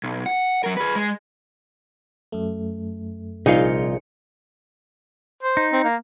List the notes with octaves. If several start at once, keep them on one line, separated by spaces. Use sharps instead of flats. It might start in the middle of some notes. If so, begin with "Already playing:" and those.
B1
F#5
F#3 A#4
G#4 B4
G#3
F#2 A3
A#1 C3 G3 C4 D#4 F4 G#4 C#7
C5
D#4
C4
A#3